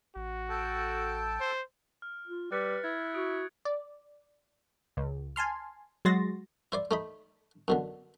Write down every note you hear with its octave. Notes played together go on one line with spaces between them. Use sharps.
A1 F#4
A4 G5 A5
C5
F6
F4
G3 B4 F#6 A6 C#7
E4 G#6
F#4 D#6 D7
D5
C#2
G#5 A5 C6 F6
F#3 G#3 F#4 C6 A6 A#6
E4 C5 D5
A3 D#4 B5
F#2 B2 D3